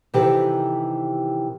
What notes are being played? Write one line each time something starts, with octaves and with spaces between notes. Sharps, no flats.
C3 D#3 E3 G4 A4 B4